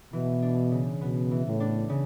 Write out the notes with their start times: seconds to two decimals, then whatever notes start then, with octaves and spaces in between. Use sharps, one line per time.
0.13 B2 E3
0.42 D4
0.71 C#3
1.01 B2 B3
1.31 E3
1.45 A2
1.60 D4
1.89 C#3